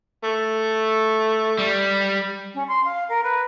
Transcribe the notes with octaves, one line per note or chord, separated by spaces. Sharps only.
A3
G3
C#4
C6
F5
A#4
B4